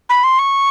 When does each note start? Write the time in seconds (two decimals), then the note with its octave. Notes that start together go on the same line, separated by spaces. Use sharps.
0.09 B5
0.24 C6
0.39 C#6